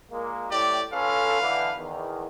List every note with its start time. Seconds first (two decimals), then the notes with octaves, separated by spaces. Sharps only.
0.10 A#2 G#3 A#3
0.51 A2 G4 D5
0.92 C#4 F4 A4 B4 F5
1.41 D3 E3
1.77 E2 D#3